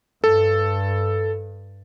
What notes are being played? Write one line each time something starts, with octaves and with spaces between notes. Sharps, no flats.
G2 A4